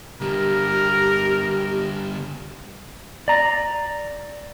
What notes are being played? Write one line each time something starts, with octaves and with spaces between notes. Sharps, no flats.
D3 G3 G4 A#4
D5 A#5